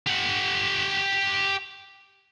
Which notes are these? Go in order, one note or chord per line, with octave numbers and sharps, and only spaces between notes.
G4 F#5